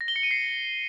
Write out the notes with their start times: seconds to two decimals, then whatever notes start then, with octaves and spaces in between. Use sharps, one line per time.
0.01 A#6
0.08 G7
0.16 C#7
0.23 D#7
0.31 C7